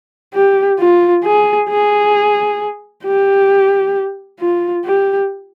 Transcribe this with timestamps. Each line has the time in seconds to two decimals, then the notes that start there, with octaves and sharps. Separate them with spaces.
0.34 G4
0.79 F4
1.24 G#4
1.70 G#4
3.04 G4
4.40 F4
4.85 G4